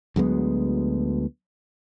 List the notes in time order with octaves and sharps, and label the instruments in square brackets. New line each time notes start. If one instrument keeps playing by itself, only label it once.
[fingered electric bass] D2 F#3 G#3 B3